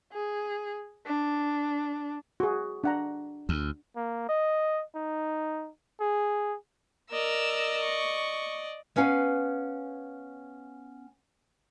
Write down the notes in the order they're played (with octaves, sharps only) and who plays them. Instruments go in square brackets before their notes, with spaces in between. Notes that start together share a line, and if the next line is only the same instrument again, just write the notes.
[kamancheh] G#4
D4
[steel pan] F#4 G#4
D4 F#5 A#5
[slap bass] D2
[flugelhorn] A#3
D#5
D#4
G#4
[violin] A#4 E6 [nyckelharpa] D5 D#5
[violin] C#6
[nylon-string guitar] B3 C#4 B4 F5 G#5